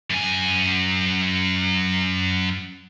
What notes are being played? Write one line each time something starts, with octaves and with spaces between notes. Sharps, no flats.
F#2 G#5